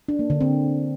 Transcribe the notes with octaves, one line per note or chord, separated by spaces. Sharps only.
D4
A#3
D3
C4